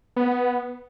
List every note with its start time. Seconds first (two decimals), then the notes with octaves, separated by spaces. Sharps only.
0.16 B3